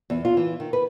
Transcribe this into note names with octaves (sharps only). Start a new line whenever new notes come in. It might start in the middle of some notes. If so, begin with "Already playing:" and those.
E2
F4
E3
D#3
B4